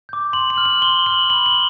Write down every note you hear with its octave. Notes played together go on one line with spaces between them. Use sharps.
D6 G6
C6 F#7
F#7
F6
F#7
C6 G7
F6 F#7
B5 F#7
G7